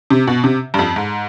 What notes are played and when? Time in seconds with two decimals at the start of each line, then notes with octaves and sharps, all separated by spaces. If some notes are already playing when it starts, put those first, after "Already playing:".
0.10 C3
0.27 B2
0.44 C3
0.74 G2
0.79 F2
0.96 G#2